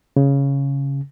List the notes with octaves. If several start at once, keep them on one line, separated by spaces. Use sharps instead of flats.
C#3